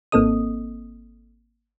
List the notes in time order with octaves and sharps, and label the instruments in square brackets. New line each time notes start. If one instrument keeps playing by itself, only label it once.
[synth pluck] G#1 A#3 C4 A4 D#5 D#6